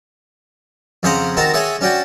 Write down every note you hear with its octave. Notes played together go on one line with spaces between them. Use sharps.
F2 C#3 G#4 C5 F#5 A#5
D#3 C4 F#4 A5 A#5
G#4 A4 C#5 E5 F#5 G#5
C#4 D4 F#4 G5 A5